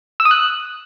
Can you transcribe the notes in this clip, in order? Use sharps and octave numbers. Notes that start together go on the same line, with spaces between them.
E6
D#6
F#6